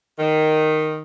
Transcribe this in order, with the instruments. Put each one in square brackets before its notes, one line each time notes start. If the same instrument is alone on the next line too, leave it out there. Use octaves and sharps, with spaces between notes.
[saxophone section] D#3